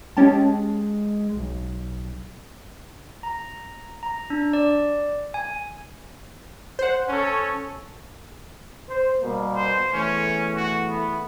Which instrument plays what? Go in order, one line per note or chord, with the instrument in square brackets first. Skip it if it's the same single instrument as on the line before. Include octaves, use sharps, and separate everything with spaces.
[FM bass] G#3 [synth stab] C#4 G4 A5
[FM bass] B1
[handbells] A#5
A#5
D4
D5
G#5
[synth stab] C5 F#5
[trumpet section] C#4 A4 C#5
[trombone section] C5
B2 G3 A#3
[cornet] C5
[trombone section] E2 E3 A3 [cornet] C#4
[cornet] F#4
B3